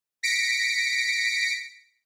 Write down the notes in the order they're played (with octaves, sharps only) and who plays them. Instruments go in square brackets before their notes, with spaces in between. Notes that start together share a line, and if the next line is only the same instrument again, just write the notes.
[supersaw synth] A#6 B6 C#7 D7